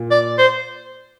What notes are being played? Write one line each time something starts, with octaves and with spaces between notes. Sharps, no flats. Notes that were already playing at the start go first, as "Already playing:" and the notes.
Already playing: A#2
D5
C5